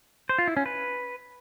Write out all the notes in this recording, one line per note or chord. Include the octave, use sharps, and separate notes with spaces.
C5
F4
E4
C#4
B4